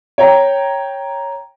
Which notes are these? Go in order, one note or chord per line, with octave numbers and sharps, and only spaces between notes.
C#5 G5 A#5